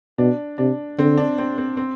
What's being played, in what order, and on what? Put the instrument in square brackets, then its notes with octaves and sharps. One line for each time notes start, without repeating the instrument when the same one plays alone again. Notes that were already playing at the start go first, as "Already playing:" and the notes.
[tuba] B2 [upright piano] D4
[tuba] C3 [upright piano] D4
[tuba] D3 [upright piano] C4
[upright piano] D4
C4
C4
C4